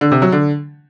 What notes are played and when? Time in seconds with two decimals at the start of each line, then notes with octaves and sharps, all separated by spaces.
0.01 D3
0.12 C3
0.22 F#3
0.32 D3